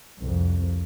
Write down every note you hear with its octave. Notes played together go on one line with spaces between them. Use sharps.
C2 F2